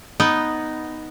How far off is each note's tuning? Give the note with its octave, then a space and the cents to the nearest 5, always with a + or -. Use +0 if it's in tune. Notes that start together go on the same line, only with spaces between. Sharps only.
B3 +0 D#4 +0